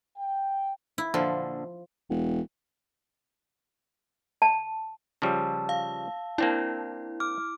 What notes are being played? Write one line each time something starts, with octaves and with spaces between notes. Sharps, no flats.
G5
E4
A#1 D3 F3 A4
E1
A5
C#3 F3 G3 A5 E6
F5
A#3 C4 D4 E4
D6 F6